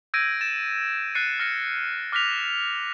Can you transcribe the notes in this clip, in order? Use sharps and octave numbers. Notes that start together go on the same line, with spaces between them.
E6 G6 G#6 A#6 D7 D#7
A6 E7
F#6 A6 C7 C#7 D#7
F6 A#6 C#7 D#7
D6 F6 F#6 A#6 B6 F7